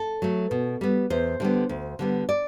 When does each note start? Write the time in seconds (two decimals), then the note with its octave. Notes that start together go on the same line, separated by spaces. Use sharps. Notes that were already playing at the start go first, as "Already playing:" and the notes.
Already playing: A4
0.22 F#3 A3
0.51 B2
0.81 G3 B3
1.10 E2 C5
1.40 D3 G3 B3
1.69 D2
1.99 D3 G3 B3
2.29 D5